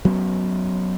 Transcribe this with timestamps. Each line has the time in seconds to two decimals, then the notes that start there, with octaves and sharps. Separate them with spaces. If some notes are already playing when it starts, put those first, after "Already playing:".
0.05 F#3 B3 C#4